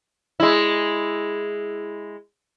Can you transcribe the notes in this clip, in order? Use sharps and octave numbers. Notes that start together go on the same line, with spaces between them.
G#3 E4